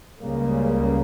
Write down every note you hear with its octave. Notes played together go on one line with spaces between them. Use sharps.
C#2 C#3 G3 A#3